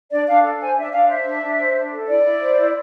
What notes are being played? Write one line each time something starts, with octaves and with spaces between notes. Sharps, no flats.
D4 D5
D4 F5
A4
C5 G#5
D4 E5
D4 F5
C5 E5
D4
D4
C5
D4
A4
E4 D5
E4
C5
E4